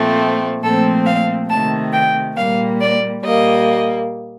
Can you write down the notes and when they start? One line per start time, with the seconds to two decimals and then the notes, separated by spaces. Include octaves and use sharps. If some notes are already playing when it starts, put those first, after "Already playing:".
Already playing: A#2 F3 A3 C4
0.62 A#2 F3 A3 C4 A4
1.06 F5
1.50 C3 D#3 A3 A5
1.93 G5
2.36 A#2 G3 A#3 F5
2.80 D5
3.23 A#2 G3 A#3 D#5